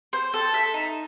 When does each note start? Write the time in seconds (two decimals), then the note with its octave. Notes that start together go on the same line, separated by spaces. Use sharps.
0.13 C5
0.34 A4
0.54 E5
0.74 D#4